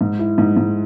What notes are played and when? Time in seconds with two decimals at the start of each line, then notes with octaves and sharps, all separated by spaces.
0.01 G#2
0.19 E4
0.38 G#2
0.57 G#2